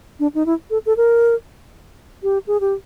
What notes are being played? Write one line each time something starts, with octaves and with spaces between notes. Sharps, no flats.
D4
D#4
E4
A4
A4
A#4
G4
G#4
G4